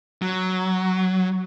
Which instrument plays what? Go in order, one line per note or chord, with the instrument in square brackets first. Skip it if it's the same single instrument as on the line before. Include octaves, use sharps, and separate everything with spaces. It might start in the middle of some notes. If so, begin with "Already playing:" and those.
[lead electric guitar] F#3